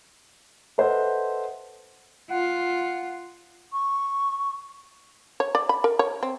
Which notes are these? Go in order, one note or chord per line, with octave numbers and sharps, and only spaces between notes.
A4 B4 C5 D#5 E5 F#5
F4 F#5
C#6
C#5
D5
B5
A#4
C#5
C4